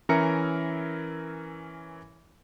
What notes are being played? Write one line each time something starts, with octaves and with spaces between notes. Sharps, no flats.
E3 C#4 A#4 E5 A#5 C#7